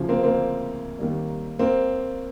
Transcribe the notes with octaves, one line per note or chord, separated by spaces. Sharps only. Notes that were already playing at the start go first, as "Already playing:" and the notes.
Already playing: D2 C#3 F3
A#3 C4
A#3 C4
D#2 D#3 G3
A#3 C4